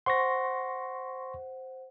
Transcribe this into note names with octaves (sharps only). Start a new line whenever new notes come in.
C5 F#5 C6 C#6 A#6